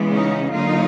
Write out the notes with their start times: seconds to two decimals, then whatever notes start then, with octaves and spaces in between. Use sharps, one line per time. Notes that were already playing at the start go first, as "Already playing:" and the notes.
Already playing: C#3 E3 G#3 B3
0.11 C#4 D#4
0.52 D3 F#3 A#3 D#4 F4